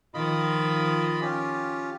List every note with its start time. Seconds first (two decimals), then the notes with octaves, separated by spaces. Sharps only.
0.14 D#3 F3 F4 D#5 B5
1.21 C#4 F4 G4